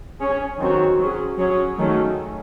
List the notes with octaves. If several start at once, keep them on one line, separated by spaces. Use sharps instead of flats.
C#4 G#4 C#5
D#3 F#3 C4 F#4 C#5
F#3 C#4 G#4
F#3 C#4 G#4 C#5
D#3 F#3 A3 C#4